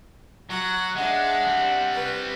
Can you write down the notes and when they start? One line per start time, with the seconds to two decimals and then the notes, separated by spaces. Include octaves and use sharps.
0.50 F#3 F#5
0.96 G#3 D4 E5 F#5
1.47 G3 C4
1.93 B4